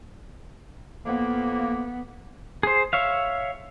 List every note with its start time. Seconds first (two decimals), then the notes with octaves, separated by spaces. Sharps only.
1.06 F2 A#3 B3
2.63 G#4 C5
2.93 C#5 E5 F5